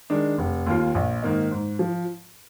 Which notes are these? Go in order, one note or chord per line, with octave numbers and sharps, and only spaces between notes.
D#3 G#3 D4
F1
D#2 D#3 A#3 F4
A#1
G#2 D#3 A#3 D#4
G#2
F3